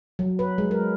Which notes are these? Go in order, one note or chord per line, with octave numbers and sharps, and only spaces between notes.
F#3
B4
G#3
A#4